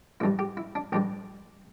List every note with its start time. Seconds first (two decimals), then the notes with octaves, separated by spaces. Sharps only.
0.20 A1 G2 G3 E4
0.39 G4
0.57 E4
0.75 D4
0.92 A1 G2 G3 G4